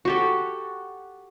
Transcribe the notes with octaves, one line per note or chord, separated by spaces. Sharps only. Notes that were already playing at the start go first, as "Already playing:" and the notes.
F#4 G4 A4